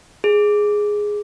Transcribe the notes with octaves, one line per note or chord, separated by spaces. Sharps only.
G#4